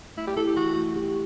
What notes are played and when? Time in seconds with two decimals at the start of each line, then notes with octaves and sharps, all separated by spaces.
0.17 A3 E4
0.27 G4
0.36 E4 A4
0.47 G4
0.57 E3 F#4
0.76 A3
0.96 G4